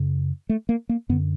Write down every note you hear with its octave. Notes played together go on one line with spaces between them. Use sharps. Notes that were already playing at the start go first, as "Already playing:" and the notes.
Already playing: F#2 C#3
A3
A#3
A#3
F#2 D3 B3